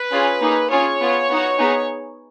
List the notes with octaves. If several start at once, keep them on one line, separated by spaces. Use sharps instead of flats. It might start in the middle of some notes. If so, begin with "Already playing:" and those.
Already playing: B4
C#4 F4 G#4
A#3 D#4 G#4
C#4 F4 G#4 C#5
B3 F4 G#4
B3 D#4 F#4
B3 D#4 G#4